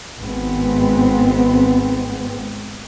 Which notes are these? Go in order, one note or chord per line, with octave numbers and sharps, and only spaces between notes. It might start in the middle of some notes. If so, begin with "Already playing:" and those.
G#1 G#3 B3 C4